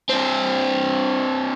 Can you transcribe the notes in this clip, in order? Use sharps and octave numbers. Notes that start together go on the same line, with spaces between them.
C4 D4